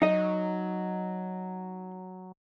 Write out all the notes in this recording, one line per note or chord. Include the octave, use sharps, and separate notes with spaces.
F#3 D#4 D#5